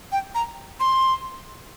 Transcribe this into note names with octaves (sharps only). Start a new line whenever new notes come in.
G5
A#5
C6